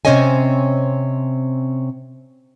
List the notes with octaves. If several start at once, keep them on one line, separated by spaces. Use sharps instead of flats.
C3 C4 C#4 C#5 D#5 G#5